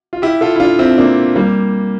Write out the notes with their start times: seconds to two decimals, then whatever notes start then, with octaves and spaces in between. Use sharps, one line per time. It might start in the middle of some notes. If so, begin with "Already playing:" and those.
0.13 F4
0.22 E4 G4
0.41 F4 A4
0.56 E4
0.60 D4 F4
0.79 C4 E4
0.98 A#3 D4
1.36 G3 A#3